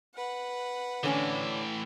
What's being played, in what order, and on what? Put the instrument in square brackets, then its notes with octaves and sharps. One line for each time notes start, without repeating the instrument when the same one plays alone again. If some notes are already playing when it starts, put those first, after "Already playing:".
[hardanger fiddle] B4 F#5
[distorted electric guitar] A2 E3 [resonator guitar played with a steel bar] D3 C#4 D4